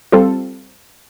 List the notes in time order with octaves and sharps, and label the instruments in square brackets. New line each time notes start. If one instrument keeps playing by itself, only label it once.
[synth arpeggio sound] G3 C4 F4 A4